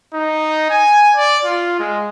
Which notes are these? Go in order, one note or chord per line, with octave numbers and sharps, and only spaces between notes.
D#4
G#5
D5
F4
G#3